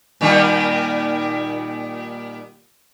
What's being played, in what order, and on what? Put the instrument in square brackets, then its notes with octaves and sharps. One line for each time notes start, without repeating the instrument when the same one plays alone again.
[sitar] A#2 D#3 G3